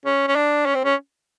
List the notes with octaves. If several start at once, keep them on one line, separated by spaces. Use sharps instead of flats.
C#4
C#4
D4
C#4
C4
C#4